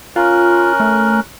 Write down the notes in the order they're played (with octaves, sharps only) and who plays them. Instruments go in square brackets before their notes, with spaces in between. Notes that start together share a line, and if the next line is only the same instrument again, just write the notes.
[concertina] C#4 A#4 F#6 [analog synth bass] F4
[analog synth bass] A3